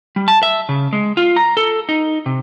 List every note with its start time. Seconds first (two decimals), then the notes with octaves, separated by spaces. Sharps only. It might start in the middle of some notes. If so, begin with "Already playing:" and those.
0.16 G3
0.28 A5
0.43 E5
0.69 C#3
0.93 G#3
1.17 F4
1.36 A#5
1.57 A4
1.89 D#4
2.26 C3